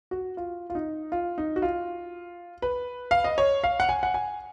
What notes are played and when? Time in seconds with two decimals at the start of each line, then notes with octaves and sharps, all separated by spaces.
0.11 F#4
0.37 F4
0.70 F4
0.75 D#4
1.12 F4
1.38 D#4
1.56 F#4
1.62 F4
2.62 B4
3.11 F5
3.24 D#5
3.38 C#5
3.64 F5
3.80 F#5
3.89 G#5
4.03 F#5
4.14 G#5